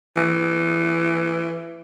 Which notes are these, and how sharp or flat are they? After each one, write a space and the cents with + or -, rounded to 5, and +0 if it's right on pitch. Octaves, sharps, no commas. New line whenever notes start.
E3 +20